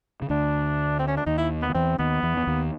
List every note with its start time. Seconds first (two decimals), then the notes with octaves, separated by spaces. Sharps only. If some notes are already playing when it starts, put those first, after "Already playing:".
0.22 C#3
0.30 D2 D3 D4
0.99 C4
1.08 C#4
1.17 D4
1.26 D#2 D#3 D#4
1.38 E4
1.62 B3
1.70 D#3
1.75 E2 E3 C4
1.98 D#2 D#3 B3
2.23 E2 E3
2.37 E3
2.47 D#2 D#3